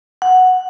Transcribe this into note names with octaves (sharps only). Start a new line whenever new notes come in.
F#5